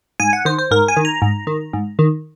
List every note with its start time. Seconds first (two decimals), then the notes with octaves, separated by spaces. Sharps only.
0.20 G#2 G#5
0.33 F#5
0.45 D#3 C5
0.59 C5
0.71 G#2 A#4
0.88 G#5
0.97 D#3
1.05 A#5
1.22 G#2
1.47 D#3
1.73 G#2
1.99 D#3